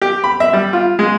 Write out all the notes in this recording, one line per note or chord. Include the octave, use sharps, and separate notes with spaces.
G4
B5
E5
G3
F4
G#3